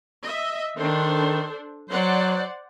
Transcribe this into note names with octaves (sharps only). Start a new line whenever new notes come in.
D#5 E5
D#3 D4 A4 C5
F#3 C5 D5 F#5